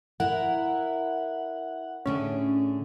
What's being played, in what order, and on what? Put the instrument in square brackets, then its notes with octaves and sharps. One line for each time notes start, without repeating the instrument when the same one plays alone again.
[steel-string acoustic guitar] E4 A#4 [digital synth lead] F#5
[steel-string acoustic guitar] A2 D3 G#4 [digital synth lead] C#4